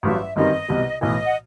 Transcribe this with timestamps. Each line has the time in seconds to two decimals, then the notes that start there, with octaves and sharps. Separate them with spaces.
0.03 A1 G2 F#3 E5
0.36 G1 F#2 D#3 G3 C4 D#5
0.68 C2 B2 G3
1.01 B1 A2 E3 D#5
1.26 F#5